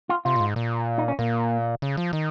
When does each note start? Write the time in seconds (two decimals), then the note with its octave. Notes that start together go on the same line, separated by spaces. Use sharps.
0.09 F4
0.25 C3 F4
0.36 A#2
0.40 G#2
0.56 A#2
0.98 D#4
1.08 C#4
1.19 A#2 A#3
1.82 C#3
1.97 F3
2.13 D#3